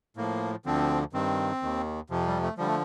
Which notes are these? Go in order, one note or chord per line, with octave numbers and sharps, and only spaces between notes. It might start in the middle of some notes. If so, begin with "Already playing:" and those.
A2 F3 A#3
D2 D3 F3 C4
G2 D#3 C4
D#2 D#3
F2 C3 F3
G3
A3
D3 F3 G3
A3